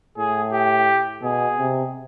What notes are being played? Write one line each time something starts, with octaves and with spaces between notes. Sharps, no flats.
A2 G#4
G4
B2 G#4
C3